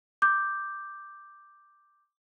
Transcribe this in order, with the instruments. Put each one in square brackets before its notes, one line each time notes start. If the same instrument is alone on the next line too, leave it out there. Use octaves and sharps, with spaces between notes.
[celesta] D6 G6